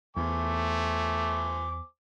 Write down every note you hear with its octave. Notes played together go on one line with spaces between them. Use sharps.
E2 A3 C5 G#5 D6